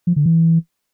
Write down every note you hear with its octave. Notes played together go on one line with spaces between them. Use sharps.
F3
D3
E3